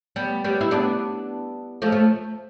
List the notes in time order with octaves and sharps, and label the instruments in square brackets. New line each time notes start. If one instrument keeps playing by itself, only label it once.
[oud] G3 B3
G3 B3
E4
B3 D4
F3 A3
A3